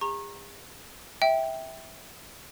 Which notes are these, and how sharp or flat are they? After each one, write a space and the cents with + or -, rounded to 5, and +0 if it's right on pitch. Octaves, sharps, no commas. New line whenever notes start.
G#4 -45 A#5 +0 C#6 -35
E5 -15 G5 +0